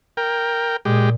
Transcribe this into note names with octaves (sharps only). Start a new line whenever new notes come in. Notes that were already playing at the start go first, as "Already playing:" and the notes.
A#4 G5
A#2 G#3 G4